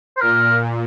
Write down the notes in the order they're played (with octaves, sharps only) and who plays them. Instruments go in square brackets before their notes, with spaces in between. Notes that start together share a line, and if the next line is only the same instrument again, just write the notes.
[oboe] C5
[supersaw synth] A#2 [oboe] A#4